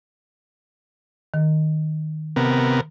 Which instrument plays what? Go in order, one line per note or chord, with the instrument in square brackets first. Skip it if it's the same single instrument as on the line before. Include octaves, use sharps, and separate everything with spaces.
[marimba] D#3
[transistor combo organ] C3 B3 A#4